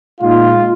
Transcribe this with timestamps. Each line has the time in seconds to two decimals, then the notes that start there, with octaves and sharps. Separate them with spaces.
0.20 A#2 G#3 D#4 F4